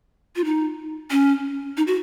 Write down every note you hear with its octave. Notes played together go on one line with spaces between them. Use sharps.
F4
D#4
C#4
D#4
F#4